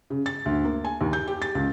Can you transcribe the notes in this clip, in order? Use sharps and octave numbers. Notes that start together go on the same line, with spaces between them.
C#3
A6
D2
A#3
G#5
D#2
G6
G4
A6
C#2